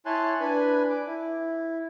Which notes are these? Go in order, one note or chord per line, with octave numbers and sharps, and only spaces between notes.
E4 C#5 G#5 A5 C6 F#6
D4 B4 G#5 B5
D6
E4